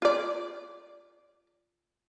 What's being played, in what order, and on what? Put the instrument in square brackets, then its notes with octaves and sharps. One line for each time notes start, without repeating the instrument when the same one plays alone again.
[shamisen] F4 D5